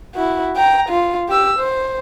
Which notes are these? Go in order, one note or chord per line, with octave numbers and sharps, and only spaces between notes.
E4 F#4
G5 A#5
F4
G4 E6
C5